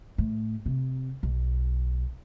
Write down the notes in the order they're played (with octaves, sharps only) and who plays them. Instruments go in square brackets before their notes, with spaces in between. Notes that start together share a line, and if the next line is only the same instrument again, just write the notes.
[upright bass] A2
C3
B1